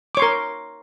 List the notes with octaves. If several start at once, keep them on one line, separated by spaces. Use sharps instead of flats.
A#4 C#5 C6 D6